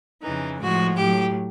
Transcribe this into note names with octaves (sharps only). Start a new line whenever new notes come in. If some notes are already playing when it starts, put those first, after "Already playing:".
F2 C#3 E3 D#4
A2 F3 G#3 F#4
A2 F#3 G4